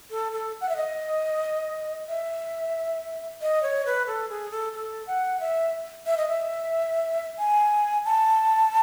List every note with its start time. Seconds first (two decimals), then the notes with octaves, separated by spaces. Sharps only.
0.10 A4
0.32 A4
0.61 F#5
0.69 E5
0.76 D#5
2.09 E5
3.42 D#5
3.63 C#5
3.86 B4
4.07 A4
4.29 G#4
4.51 A4
4.73 A4
5.07 F#5
5.40 E5
6.06 E5
6.17 D#5
6.28 E5
7.39 G#5
8.05 A5